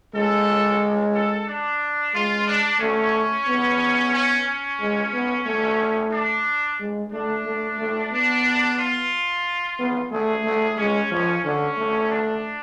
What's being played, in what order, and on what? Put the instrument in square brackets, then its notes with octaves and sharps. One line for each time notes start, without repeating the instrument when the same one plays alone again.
[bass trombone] G#3 [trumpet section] A4
[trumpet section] A4
D4
[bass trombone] G#3 [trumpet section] F4
[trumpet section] D4
[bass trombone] A3 [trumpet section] C#4
[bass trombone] B3
[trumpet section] C#4
C#4
[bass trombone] G#3
B3
A3
[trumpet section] D4
[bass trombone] G#3
[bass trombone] A3 [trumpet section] D4
[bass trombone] A3
A3
[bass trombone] B3 [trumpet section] D4
[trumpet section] F4
[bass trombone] B3
[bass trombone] A3 [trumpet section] G#4
[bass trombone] A3
[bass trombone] G#3 [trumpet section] C#4
[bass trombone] F3 [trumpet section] C#4
[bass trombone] D3 [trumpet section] C#4
[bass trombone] A3
[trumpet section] D4